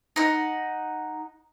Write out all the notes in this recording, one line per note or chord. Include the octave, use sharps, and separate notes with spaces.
D#4 F#5